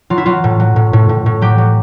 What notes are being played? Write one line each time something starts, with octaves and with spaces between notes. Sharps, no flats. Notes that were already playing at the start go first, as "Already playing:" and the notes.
F#3 F4
E4
F#3 F4
A2
F#3
A2
A2
A2
A2
F#3 G4
F#3